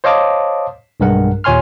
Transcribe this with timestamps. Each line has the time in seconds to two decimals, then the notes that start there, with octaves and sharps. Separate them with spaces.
0.04 C5 C#5 D#5 F5 A5 D6
1.00 B1 G2 G#3 A#4 F#5
1.44 D#2 A#2 C#5 G#5 C6 F6